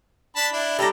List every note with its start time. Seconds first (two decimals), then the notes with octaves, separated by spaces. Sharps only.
0.36 D4 A5 B5
0.53 D4 E4
0.79 G3 G4 A4 A#5